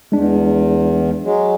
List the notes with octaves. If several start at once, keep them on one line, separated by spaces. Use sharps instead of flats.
E2 G#3 D4
F#3 G#3